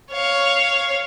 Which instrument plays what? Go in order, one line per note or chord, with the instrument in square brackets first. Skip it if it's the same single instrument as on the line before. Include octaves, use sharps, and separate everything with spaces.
[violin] C#5 F5